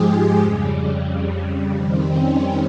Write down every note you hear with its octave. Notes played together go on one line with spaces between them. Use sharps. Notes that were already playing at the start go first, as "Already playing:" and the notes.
Already playing: G#2 F3 G#3 G4 G#4
F2 C#3 G3
F2 D#3 G3 C4
C#4